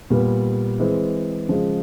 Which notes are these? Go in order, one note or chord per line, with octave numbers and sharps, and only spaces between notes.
A#2 G3 B3
E3 G#3 C4
C#3 F3 G#3